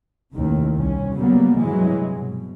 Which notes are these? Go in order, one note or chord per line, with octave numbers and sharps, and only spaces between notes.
A1 D#2 C3 D#3
C2 C#4
C#3 F#3 G3 A#3 B3
G2 C3 E3 F#3 G#3
B2